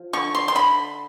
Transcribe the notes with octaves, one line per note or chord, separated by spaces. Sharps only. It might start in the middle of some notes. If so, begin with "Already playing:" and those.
Already playing: F3
D3 C#6
C6
C6
D3 B5